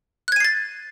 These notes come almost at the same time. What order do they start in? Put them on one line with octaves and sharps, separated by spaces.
F#6 G#6 D#7 C7 A6